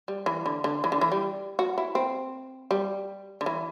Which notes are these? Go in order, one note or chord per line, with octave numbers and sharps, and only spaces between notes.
G3
E3
D3
D3
E3
D3
E3
G3
F#4
E4
C4
G3
D3
E3